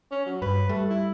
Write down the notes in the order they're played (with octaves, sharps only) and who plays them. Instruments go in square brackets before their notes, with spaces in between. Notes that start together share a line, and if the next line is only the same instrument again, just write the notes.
[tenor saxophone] C#4
F#3
[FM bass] G2 [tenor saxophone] B4
[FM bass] G3 [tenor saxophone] A3
[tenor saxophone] E4